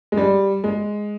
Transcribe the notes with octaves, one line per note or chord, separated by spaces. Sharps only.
G#3
G3
G#3